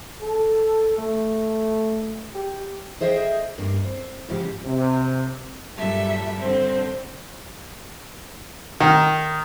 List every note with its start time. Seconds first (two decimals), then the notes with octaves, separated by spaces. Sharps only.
0.22 A4
0.98 A3
2.35 G4
3.01 G#4 C5 D#5 E5 F#5 G5
3.58 G2 A#3 D4
3.85 C4
4.29 G#2 C#3 F3 G#3 G4
4.66 C3
5.77 G2 A#2 F#3 G3 A4 E5
6.38 D3 G3 C4
8.80 D#3